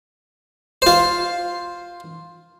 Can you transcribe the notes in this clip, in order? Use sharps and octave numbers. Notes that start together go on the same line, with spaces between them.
F4 C5